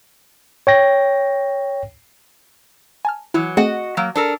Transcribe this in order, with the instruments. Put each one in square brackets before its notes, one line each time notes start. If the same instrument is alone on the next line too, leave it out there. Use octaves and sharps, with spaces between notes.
[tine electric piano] C#5 G5 A#6
[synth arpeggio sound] G#5 A5 F6
[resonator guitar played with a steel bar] E3 F#3 [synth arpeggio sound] E4
[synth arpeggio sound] A3 C4 G#4 [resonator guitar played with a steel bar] F#4 D#5 F#5
[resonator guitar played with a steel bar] F#3 A#3
D4 A4 A#4